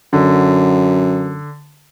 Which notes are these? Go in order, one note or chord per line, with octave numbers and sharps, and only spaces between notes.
F#2 D3